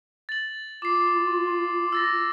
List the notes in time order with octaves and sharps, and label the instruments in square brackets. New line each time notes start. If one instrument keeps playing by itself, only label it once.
[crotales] A6 F#7
[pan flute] F4 [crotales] D6 C7
[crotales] E6 A6 A#6